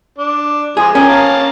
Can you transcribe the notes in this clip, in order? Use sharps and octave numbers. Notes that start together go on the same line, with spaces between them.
D4
F3 G#3 G#4
C#4 G4 G#4 A#4
F5 A5 A#5